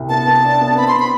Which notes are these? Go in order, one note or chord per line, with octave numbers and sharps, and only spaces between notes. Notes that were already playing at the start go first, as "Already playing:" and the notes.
Already playing: C2
B3 A5
B3
D4
B3
C4 B5
C6
C4
B5